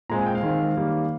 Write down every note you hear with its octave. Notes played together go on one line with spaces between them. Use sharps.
A#2 G#3 C4 A#5
G#5
G5
F5
D#3 G#3 C4
D#3 G3 A#3